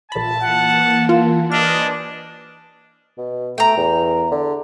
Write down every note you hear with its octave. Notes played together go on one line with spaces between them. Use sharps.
A#1 F4 E5 A5 B5
E3 A#3 F#5
F4
D4 G4 B4 C5 D#5 G#5 F6
B2
A3 G5 A#5
E2
D3